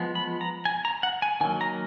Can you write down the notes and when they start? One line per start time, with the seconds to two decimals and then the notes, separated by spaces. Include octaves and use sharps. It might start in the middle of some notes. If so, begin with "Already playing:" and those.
Already playing: F3 G#3 B3
0.15 B5
0.41 A#5
0.65 G#5
0.85 A#5
1.03 F#5
1.22 G#5
1.41 D#3 F#3 A#3 G#5
1.61 A#5